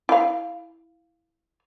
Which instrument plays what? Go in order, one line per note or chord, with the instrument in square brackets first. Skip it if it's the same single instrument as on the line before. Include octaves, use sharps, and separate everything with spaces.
[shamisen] E4 F5